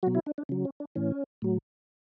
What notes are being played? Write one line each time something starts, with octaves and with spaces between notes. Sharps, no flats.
B2 F#3 F#4
E4
D4
D4
C#3 F#3
C#4
D4
A2 E3 C#4
A2 F#3